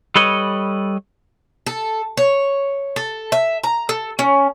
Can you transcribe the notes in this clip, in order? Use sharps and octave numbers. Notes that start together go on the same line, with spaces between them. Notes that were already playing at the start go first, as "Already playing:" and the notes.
G3 A4 B4 C#5 D#5
A4
C#5
A4
E5
A#5
A4
C#4